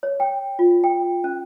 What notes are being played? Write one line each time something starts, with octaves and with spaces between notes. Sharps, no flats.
C#5
G5
F4
G5
C#4